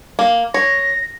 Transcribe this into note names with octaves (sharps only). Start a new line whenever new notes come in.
A#3
C#5 A#6